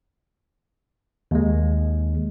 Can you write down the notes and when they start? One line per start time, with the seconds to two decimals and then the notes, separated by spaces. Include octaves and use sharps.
1.31 D#2 G#3